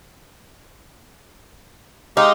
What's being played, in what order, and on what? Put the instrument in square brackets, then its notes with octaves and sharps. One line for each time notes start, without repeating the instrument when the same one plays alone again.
[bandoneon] G#3 G4 F5 [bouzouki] D#4